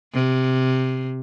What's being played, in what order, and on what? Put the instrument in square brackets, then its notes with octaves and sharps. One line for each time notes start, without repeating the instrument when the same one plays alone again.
[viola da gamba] C3